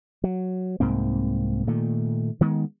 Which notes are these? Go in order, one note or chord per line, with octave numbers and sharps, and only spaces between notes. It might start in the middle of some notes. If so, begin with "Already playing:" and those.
F#3
C2 G#2 A#3 C4
A#2 D#3 A3
D#3 G#3 B3